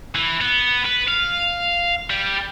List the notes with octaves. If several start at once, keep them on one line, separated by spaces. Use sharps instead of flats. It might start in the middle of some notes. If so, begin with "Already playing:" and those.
E3
B3
B4
F5
G3